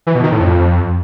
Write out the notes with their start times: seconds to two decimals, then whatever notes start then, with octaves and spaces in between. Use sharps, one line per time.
0.07 E3
0.15 B2
0.23 D#3
0.32 A2
0.40 F2